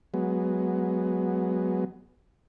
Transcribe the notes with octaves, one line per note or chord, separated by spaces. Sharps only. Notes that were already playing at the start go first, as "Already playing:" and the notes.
F#3 G#3 B3